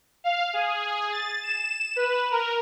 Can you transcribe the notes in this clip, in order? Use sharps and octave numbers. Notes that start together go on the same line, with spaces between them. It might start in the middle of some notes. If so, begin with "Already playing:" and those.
F5
G#4
A6
E7
B4
A#4